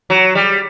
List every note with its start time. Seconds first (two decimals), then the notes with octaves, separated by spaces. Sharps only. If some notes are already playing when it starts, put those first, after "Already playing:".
0.10 F#3
0.35 G3